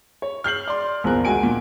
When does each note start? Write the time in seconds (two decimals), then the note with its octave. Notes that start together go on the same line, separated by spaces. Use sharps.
0.22 C#5
0.44 F6 G6 C7 F#7
0.67 D5 C6
1.04 A#1 E2 F3 A#4 F#6
1.25 D2 G#3 F#4 G#5 D7
1.43 A#2